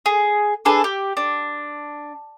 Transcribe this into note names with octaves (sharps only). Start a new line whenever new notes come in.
G#4
D4 G#4 A4 B4
G4
D4